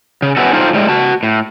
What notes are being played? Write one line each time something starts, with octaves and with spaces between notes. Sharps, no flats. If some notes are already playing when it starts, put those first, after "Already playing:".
C#3
B3 C#4 E4 F#4 A4
D#4 F4 G4 A4 C5
A2 G3 G#3
F#4 A5
A2